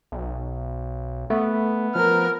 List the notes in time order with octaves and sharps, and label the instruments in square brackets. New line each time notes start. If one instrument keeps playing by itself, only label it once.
[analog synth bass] B1
[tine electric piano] A3 [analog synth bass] B3
[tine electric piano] F3 [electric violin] A#4 F6